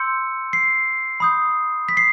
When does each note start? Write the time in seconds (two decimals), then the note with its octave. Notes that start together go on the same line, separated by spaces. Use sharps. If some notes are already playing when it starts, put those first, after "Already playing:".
Already playing: C6 E6 G6 C#7
0.53 C7
1.20 B5 D#6 G6
1.89 B6
1.97 C7